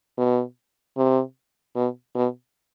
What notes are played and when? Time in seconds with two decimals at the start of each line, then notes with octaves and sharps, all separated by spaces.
0.18 B2
0.97 C3
1.75 B2
2.15 B2